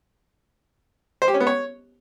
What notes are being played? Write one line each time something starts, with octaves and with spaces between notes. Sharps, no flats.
C5
G4
C#4
B3
C#5